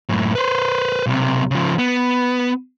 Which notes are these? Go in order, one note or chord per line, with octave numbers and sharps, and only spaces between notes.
F#2 A2
B4 C5
B1 C3
C#3 F3
B3